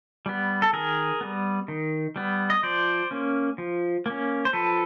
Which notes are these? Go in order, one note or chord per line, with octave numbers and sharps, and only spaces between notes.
G3 B3
A4
D#3 G#4 A#4
G3 B3
D#3
G3 B3
D#5
F3 C5 D5
A#3 C#4
F3
A#3 C#4
C5
F3 A4 B4